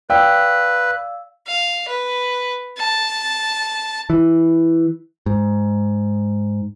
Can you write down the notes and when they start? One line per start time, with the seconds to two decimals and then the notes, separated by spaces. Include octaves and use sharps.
0.10 B4 D5 F5 G5 E6
1.46 F5
1.88 B4
2.78 A5
4.10 E3
5.26 G#2